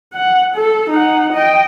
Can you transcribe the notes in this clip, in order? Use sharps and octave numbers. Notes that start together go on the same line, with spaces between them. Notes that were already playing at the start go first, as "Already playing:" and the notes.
F#5
A4
D#4 F#5
D#5 G5